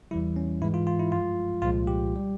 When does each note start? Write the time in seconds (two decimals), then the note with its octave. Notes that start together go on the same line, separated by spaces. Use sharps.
0.11 E2 E3 G3 E4
0.36 C#4
0.61 G#2 E3 G#3 E4
0.74 F4
0.87 F4
0.99 E4
1.12 G2 F3 G#3 F4
1.62 C2 A#2 F3 G#3 F4
1.87 G4
2.16 G3